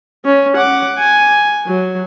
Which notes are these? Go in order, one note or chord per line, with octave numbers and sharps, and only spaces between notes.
C#4
F#5 D6
G#5
F#3